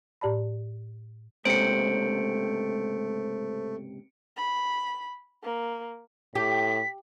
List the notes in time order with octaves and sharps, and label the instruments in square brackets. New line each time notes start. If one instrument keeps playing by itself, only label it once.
[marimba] A2 G4 D5 A5 B5
[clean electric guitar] C#2 G#2 C3 [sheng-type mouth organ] A3 [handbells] C5 [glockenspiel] C#7 D7
[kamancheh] B5
A#3
[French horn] A2 [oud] G4 [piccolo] B6